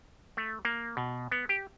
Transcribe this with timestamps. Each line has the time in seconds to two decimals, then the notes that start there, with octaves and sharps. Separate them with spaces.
0.37 A3
0.65 A#3
0.97 B2
1.32 B3
1.49 G4